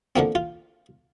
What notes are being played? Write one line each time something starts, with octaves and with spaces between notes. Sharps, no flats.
D3 F3 A#3 C4
F4